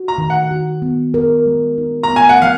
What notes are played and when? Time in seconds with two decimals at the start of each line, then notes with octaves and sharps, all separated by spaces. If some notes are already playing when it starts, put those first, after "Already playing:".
Already playing: F#4
0.08 A#5
0.18 D#3
0.30 F#5
0.51 F#4
0.82 B3
1.14 A#4
1.46 G#3
1.78 D#4
2.03 A#5
2.10 B3
2.16 G#5
2.29 F#5
2.42 F3 F5